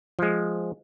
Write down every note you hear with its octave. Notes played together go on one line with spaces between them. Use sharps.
F3 G#3